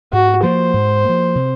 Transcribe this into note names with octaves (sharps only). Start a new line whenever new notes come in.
G#2 F#4
F3 A#3 C5
G#2
F3 A#3
C3